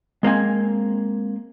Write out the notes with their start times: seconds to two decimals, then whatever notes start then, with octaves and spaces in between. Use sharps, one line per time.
0.23 G#3 A#3 C4 G#5